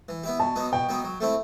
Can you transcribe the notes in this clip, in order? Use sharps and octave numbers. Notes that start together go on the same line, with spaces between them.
E3
B3 E4 G4
B2 A5
F#3 B3 D#4
B2 G5
F#3 B3 D#4
F#3
A3 C4 E4